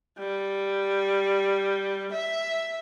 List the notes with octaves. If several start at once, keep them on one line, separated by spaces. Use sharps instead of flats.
G3
E5